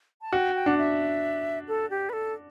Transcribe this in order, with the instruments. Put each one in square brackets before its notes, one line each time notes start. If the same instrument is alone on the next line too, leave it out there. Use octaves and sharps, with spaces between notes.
[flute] A5
[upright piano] F#4 [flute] G5
[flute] G5
[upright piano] D4 [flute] F#5
[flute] E5
A4
G4
B4
A4